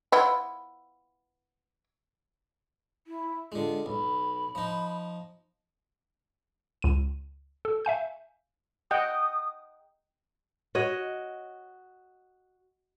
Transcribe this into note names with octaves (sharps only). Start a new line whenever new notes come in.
B3 E4 F4
E4
D3 G#3 F4
B1 B5
F3 D#4
C#2 D#7
A4
E5 F5 G#5 G6
D#5 F#5 G5 D#6
F#4 C#5 D#5